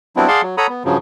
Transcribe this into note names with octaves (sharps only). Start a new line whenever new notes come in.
F#3 G3 B3 C4 D4 E4
G#4 D5 F5 F#5 A5 C6
F#3
A4 C#5 F#5 A#5 B5 D#6
B3
G2 C#3 F3 F#3